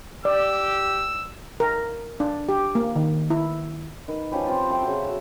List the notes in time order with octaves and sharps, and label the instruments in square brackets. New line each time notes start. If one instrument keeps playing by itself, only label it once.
[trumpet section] G4 [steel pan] D5 [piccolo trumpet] E6
[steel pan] A#4
D4
G4
A#3
D#3
E4
[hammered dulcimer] D#3 B4
F3 C#4 G4 B4
C4 F4
A4 C5 E5 G5
C#3 F#4
F#4 E5